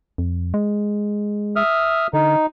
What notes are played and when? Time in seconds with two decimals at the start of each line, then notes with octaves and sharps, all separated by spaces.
0.18 F2
0.54 G#3
1.56 E5 D#6 F6
2.13 D3 D#4